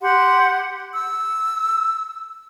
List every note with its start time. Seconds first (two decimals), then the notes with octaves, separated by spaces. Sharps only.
0.03 G4 F#5 C6
0.92 E6